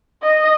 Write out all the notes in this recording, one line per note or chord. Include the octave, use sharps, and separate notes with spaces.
D#5